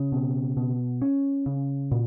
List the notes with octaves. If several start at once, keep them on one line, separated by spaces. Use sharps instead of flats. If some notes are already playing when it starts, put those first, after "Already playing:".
Already playing: C#3
B2
B2
C#4
C#3
A#2